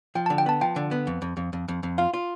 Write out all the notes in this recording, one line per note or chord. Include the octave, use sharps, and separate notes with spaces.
F3 G5
A5
D3
G5
B3 A5
F3 G5
D3
B3
F2
F2
F2
F2
F2
F2
F4 F5
F4